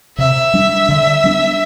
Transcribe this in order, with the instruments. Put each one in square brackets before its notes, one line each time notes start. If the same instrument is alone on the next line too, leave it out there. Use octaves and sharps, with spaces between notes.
[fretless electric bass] C3 [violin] E5
[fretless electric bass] G3 D4
D3
G3 B3 D4